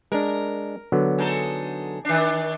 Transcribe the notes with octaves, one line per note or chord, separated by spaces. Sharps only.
G#3 D4 A#4
D3 F#3 B3
G#3 D#4 A4
D#3 D4